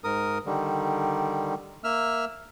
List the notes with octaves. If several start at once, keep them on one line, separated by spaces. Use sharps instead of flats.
G#2 A#4 D#6
D3 D#3 G3
A#3 E5 E6 F6